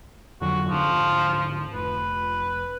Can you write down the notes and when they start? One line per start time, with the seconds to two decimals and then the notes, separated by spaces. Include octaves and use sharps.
0.41 F2 D3 F#3 F#4
0.69 D1 G#2 D3 F3
1.74 F1 B4